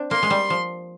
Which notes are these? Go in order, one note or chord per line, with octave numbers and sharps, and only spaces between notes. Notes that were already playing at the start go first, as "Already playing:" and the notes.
Already playing: C4 D4
A#3 C6
G#3
G3
F3